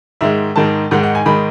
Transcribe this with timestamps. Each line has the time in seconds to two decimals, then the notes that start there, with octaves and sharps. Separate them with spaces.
0.21 G#2 D#3 G#3 E5
0.56 G#2 D#3 G#3 A5
0.91 G#2 D#3 G#3 F#5
1.03 F#5
1.15 G#5
1.25 G#2 D#3 G#3 B5